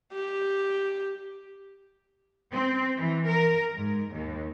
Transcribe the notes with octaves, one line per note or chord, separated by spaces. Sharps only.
G4
C4
E3
A#4
G#2
D#2